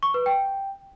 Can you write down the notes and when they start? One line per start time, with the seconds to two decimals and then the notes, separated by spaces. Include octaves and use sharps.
0.03 C#6
0.14 B4
0.26 G5